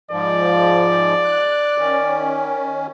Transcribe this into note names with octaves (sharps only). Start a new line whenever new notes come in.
G#2 F3 D5
F#6
D#3 C#4